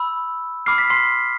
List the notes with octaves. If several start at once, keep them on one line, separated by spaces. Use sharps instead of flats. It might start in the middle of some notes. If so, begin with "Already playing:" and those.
Already playing: B5 E6
B5 D6 F6 C7
B6
C6 C7